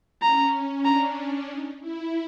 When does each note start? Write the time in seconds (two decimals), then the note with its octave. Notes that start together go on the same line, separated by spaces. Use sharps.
0.22 C#4 A#5
0.85 D4 A#5
1.49 D#4
1.81 E4